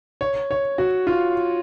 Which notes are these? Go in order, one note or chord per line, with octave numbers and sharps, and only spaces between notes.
C#5
C#5
F#4
F4